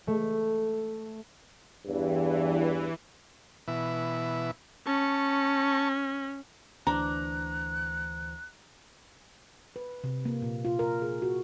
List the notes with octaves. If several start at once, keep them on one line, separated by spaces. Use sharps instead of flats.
A3
E2 G2 E3
B2 E3 E4
C#4 A5 C#6
D2 E3 D4 C5 A#5 F#6
B4
C3
A#3
A#2
F4
A#4
G#4
F#4